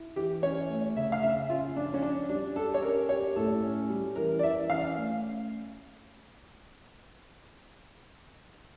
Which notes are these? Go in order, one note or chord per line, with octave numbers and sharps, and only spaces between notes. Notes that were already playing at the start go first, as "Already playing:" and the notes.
Already playing: E4
E3 G4
C#4 C#5
A3
C#3 E5
F5
C#3 E5
C#4 F4
F3 D4
C#4
D4 D5
G3 D4
G4 A4
C#5
C#4 A#4
G4 C#5
A2 A4
C#4
G3
E3 A#4
D5
E3 E5
C#4 F5
A3